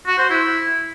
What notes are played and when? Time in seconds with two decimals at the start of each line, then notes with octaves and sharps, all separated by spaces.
0.07 F#4
0.18 C5
0.30 E4